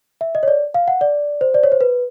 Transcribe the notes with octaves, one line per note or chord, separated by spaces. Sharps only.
E5
D#5
C#5
D5
F5
F#5
D5
C5
D5
C#5
C5
B4